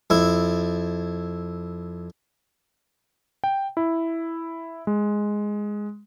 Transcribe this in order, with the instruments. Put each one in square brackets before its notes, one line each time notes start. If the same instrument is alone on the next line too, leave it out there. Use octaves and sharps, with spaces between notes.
[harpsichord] F2 E4
[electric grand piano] G5
E4
G#3